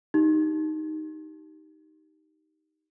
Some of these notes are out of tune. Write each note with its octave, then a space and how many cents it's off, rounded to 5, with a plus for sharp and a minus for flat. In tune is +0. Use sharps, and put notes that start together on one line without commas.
D#4 +0 G4 -10